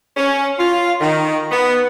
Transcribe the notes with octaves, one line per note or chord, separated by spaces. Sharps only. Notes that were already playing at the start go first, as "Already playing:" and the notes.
C#4
F4
D#3
B3